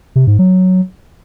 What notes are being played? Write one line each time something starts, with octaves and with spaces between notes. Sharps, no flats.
C3
G#2
F#3